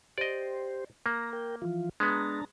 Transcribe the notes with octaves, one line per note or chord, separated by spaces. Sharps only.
G4 C5 D5 D#5
A#3 A#5
A#4 G5
E3 F3 F4
G#3 B3 D4 A5 A#5